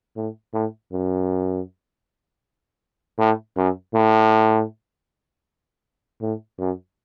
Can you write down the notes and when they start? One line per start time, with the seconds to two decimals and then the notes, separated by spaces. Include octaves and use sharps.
0.16 A2
0.54 A2
0.92 F#2
3.19 A2
3.57 F#2
3.94 A2
6.21 A2
6.59 F#2